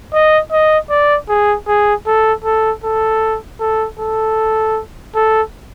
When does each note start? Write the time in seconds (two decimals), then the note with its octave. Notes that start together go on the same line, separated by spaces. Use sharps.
0.13 D#5
0.52 D#5
0.90 D5
1.29 G#4
1.67 G#4
2.06 A4
2.45 A4
2.84 A4
3.60 A4
3.99 A4
5.15 A4